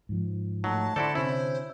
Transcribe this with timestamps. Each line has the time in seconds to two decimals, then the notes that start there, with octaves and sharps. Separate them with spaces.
0.09 G#2 F3
0.64 A2 F#3 D#4 A5
0.96 D3 E4 F#4 A4 C5 D5 D6
1.15 C3 C#4 E4 C5